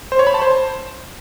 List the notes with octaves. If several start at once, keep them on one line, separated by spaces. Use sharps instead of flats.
C5
C#5
B5
A5
C5